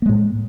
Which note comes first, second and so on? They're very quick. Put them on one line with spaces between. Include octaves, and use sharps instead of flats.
A#3 G#3 A2